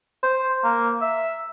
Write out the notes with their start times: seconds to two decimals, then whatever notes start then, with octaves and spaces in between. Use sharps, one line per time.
0.23 C5
0.64 A#3
1.01 E5